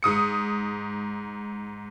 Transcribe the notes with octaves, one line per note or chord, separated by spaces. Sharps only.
G#2 D#6 C#7